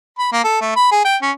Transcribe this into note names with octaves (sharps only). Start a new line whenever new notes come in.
B5
A#3
A4
A3
B5
G#4
G5
C#4